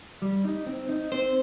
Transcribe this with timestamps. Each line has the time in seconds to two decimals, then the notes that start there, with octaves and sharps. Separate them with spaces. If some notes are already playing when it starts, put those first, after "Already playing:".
0.22 G3
0.44 D#4
0.66 C4
0.89 D#4
1.12 C4 C5